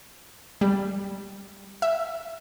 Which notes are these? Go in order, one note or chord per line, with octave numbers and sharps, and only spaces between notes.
G3
E5